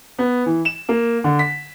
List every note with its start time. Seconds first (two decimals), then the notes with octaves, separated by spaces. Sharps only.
0.19 B3
0.46 E3
0.65 E7
0.89 A#3
1.24 D3
1.39 B6